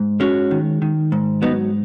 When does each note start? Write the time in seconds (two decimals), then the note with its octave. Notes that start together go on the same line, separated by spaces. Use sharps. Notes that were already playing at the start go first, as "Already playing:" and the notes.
Already playing: G#2
0.20 G#3 C#4 F#4
0.51 D#3
0.82 D#3
1.12 G#2
1.42 F#3 B3 D#4